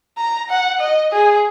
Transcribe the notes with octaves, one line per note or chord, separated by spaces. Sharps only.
A#5
F#5
D#5
G#4